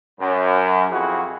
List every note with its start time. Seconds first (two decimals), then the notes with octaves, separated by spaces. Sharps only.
0.20 F#2
0.91 F2 F3 E4 F#4 G#4